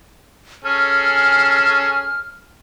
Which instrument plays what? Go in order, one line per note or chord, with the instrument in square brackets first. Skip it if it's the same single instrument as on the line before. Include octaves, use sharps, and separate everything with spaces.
[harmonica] C#4 G#4 A4 [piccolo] F6